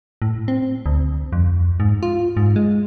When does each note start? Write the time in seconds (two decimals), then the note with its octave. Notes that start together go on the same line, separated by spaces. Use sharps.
0.22 A2
0.48 C4
0.86 D2
1.33 F2
1.80 G#2
2.03 F4
2.37 G#2
2.56 G#3